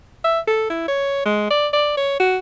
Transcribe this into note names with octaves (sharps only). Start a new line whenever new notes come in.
E5
A4
E4
C#5
G#3
D5
D5
C#5
F#4